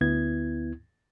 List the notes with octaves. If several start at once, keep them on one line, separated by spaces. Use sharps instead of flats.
D2 B3 E4 G#6